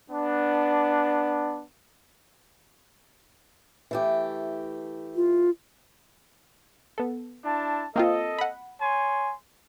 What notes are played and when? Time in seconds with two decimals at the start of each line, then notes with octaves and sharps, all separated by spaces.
0.11 B3 D4
3.91 E3 A3 G4
5.16 F4
6.98 B3 A4
7.45 D4 E4 A5
7.96 A#3 C4 F4 A4 D#5
8.39 F#5 B5
8.81 C#5 G#5 C6